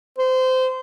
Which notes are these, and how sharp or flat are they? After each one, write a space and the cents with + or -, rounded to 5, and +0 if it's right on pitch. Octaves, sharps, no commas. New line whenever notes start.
C5 -20